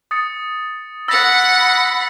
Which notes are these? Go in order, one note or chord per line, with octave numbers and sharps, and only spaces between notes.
D#6 A6 C#7
F#5 B5 E6 A6 A#6